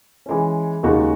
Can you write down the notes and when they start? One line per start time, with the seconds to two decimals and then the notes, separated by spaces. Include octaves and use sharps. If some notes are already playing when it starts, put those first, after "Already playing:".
0.26 E3 G#3 C#4
0.83 D#2 C#3 G#3 D#4 F#4